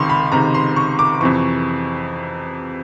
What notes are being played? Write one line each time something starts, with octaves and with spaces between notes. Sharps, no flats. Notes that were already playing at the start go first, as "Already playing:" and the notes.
Already playing: C#2 C3 D#3 C6 C#6
B5
C#2 C3 D#3 A#5
C6
C#6
D6
F2 C3 E3 C#6